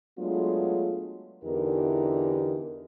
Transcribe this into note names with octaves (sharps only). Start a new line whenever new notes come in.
F#3 G#3 A3 B3 D4 F4
E2 D3 E3 D#4 G4 A#4